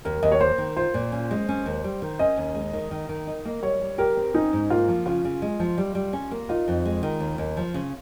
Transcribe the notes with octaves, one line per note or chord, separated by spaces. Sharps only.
D#2 A#4
D#2 D#5
C#5
A#3 C5
D#3
F4 C5
A#2
C#4
G#3
C#4
D#2
G3
D#3
C#4 D#5
D#2
G#3
D#3
D#3
D#3
D#4
A#3
G3 C#5
G3
G4 A#4
C4
C#4 D#4
G#2
A#3 F4
F3
C#3 F4
C#3
G#3
F3
G3
G3
C#4
A#3
D#4 F4
F2
G#3
D#3
D#2
D#2
F3
C#3